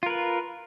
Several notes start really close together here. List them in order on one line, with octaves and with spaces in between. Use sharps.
F4 A#4 B4